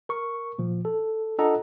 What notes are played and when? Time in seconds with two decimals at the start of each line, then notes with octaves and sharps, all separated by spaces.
0.09 A#4 C#6
0.58 A#2 F3
0.85 A4
1.38 D4 F4 A4 D#5 F#5 A#5